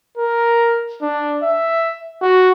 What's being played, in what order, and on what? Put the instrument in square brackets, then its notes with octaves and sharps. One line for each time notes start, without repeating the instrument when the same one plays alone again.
[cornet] A#4
D4
E5
F#4